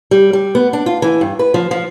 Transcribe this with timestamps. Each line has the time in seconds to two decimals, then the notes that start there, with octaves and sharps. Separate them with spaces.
0.11 G3
0.33 G3
0.55 B3
0.73 D4
0.86 F4
1.02 E3
1.21 G2
1.39 B4
1.54 F3
1.71 F3